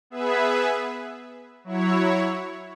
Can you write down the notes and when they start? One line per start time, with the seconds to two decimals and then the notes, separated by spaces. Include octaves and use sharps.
0.10 B3 G#4 B4 E5
1.64 F#3 E4 C#5